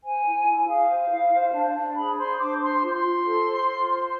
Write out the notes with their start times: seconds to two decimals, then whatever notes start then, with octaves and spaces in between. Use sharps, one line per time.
0.03 C5 G#5
0.24 E4
0.46 E4
0.67 G#4 F5
0.89 C5
1.10 E4
1.32 C5
1.53 D4
1.75 D4
1.96 G#4 B5
2.17 C5 C6
2.39 D4 D6
2.60 C5 C6
2.82 F4
2.93 C6
3.03 F4
3.25 A4
3.46 C5
3.68 F4
3.89 C5